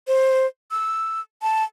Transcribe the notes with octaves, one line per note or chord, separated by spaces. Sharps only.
C5
E6
A5